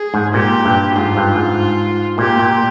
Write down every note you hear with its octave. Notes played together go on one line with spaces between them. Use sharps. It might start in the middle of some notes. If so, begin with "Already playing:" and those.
Already playing: G#4
G#2
A#2 G4
G2
G#2 F4
G2
G#2
A#2 G4
A#2